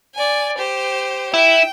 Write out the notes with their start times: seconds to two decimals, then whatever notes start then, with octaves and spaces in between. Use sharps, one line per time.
0.15 D5 G#5
0.58 G4 C5
1.34 E4 G5